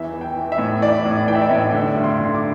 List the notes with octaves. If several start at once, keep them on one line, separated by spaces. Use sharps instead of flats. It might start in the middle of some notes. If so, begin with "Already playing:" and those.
Already playing: E2 E3 E5
E3
G5
E3
E5
A2
E3 D5
A2
E3 G5
E5
D5
A2 E5
D3
G2
C6
D3
D6